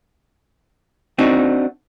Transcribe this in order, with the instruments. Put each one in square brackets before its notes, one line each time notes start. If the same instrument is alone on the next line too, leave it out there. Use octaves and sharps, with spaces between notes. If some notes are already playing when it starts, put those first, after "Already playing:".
[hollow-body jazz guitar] C4 D4 D#4 F#4